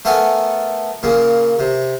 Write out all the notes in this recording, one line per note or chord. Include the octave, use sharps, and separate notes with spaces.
A3 B3 A4 A#4 G#5
A#2 C#3 A#3
C3